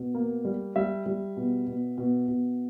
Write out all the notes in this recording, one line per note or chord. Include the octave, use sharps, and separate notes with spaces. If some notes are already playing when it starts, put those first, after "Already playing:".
Already playing: B2
A#3
G3
G3 E5
G3
B2
B2
B2
B2